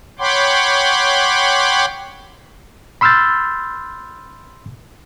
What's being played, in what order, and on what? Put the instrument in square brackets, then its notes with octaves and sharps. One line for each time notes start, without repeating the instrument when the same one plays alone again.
[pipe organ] C#5 F#5 G5 B5 C6 D6
[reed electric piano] B5 C6 E6 F6 G6 A6